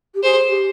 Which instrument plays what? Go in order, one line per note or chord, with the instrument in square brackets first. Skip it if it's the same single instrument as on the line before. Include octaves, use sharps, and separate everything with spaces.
[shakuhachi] G4
[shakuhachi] G#4 [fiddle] C5
[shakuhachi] G4